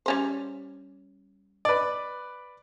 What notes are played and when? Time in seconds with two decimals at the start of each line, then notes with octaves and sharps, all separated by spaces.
0.06 G3 C#4 C5
1.65 B4 D5